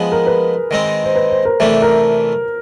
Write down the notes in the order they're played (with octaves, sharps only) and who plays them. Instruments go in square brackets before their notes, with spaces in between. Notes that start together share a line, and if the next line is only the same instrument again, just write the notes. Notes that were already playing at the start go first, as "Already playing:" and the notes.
Already playing: [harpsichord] F3 G#3 B3 [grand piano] G#4
[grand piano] A#4
B4
[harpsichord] D#3 G#3 C4 D#4
[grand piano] C5
B4
C5
A#4
[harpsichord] C3 E3 A3 D4 [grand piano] A#4
[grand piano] A#4